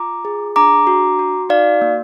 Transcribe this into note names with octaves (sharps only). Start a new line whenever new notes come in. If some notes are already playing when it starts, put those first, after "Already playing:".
Already playing: F4 A#5 D6
G#4
D4 A#5 D6
F#4
F#4
D#4 D5 F5
A#3